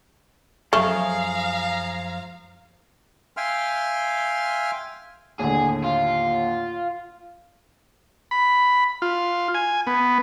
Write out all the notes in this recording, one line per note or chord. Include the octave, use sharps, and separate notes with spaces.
F#2 F3 G#3 A3 G#4 F5 A#5 F6
E5 F5 G5 G#5 C6 F6
D#2 A2 D3 G#4
F4
B5
F4
G#5
B3